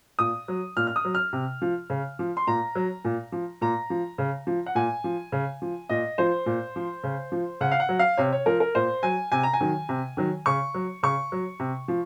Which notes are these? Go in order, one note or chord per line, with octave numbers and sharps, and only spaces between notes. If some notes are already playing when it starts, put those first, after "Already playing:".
A#2 D#6
F#3
A#2 F6
F6
D#6
F#3
F6
C3
F3
C#3
F3
C6
A#2 A#5
F#3
A#2
F3
A#2 A#5
F3
C#3
F3
F#5
A#2 G#5
F3
C#3
F3
A#2 D#5
F3 C5
A#2
F3
C#3
F3
C#3 F#5
F5
F#5
F#3
F5
C3 C#5
C#5
F3 A#4
A#4
A#2 C5
F#3 G#5
C3 G#5
A#5
G#5
D#3 F#3
C3
D#3 F#3
C#3 C#6
F#3
C#3 C#6
F#3
C3
F3